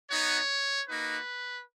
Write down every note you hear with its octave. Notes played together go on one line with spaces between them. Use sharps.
B3 D#4 F#4 C#5
A#3 D#4 F#4 B4